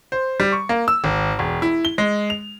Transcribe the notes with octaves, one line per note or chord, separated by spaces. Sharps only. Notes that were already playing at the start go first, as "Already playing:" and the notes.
C5
G3
C#6
A#3
E6
G#1
E1
E4
G7
G#3
F7